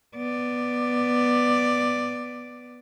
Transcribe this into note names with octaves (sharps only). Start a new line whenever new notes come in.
B3 D5